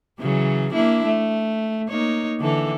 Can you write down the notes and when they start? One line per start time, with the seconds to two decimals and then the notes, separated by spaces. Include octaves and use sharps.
0.20 C#3 E3 F#3
0.73 A#3 D4 E4
1.05 A3
1.89 A#3 D#4 C#5
2.40 D3 E3 A4